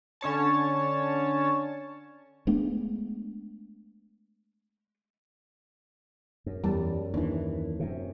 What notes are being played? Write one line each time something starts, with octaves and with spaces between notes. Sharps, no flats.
D3 C#4 C#5 A5
G#3 A3 B3 D4
F#2
E2 G3 A5
D#2 E3 D4
F#2 C3